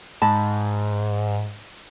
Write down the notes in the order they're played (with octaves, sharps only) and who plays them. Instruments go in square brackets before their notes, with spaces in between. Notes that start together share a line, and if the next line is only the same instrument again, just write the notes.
[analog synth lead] G#2 [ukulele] D#5 A5 B5